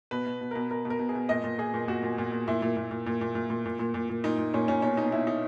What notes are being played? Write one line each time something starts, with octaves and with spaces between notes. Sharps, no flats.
B2 B4
B2
B2
B2 A#4
B2 A#4
B2
A#4
B2
G#4
B2
A#2 D#5
A#2
A#2 G#4
A#2
A#2 F#4
A#2
A#2
A#2
A#2 E4
A#2
A#2
A#2
A#2
A#2
A#2
A#2
A#2
A#2
A#2
A#2
A#2 D#4
A#2
A#2 C#4
A#2 C#4
B2 C#4
B2 D#4
B2 E4
B2 D#4